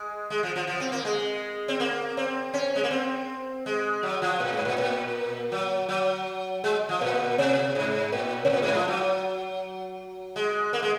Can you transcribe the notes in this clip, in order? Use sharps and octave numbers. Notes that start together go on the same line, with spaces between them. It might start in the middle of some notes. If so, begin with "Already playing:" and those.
Already playing: G#3
G#3
F3
F3
F3
C4
A#3
G#3
C4
A#3
C4
C#4
G#3
A#3
C4
G#3
F#3
F3
A#2
G#2
A#2
A#2
F#3
F#3
G#3
F3
A#2
C3
G#2
A#2
C3
A#2
G#2
F3
F#3
G#3
A#3
G#3